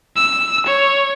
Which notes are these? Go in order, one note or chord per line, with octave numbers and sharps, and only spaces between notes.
E6
C#5